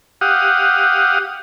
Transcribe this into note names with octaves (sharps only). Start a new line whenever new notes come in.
G4 F5 F#5 D#6